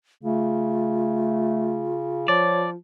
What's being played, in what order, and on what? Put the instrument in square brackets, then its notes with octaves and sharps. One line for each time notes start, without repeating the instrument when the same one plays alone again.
[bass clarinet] C#3 [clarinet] A3 [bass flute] F4
[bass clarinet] F3 [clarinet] C#5 [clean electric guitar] D5